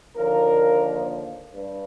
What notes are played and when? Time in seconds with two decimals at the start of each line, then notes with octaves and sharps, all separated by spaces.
0.16 D#2 D3 F3 A#3 A#4
1.56 G2